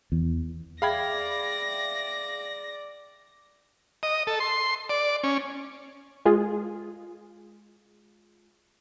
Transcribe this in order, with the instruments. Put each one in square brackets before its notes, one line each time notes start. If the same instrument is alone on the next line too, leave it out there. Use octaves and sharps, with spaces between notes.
[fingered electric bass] E2
[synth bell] G#4 E5 G5 [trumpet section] D5 [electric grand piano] F5 B5 G#6 [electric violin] A#6
[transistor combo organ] D#5
A4
C6
D5
C#4
[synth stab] G#3 F4 G#4